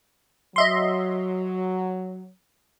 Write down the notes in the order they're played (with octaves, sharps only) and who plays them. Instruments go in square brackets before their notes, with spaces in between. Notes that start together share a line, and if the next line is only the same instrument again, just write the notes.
[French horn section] F#3 [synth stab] D#5 E5 C6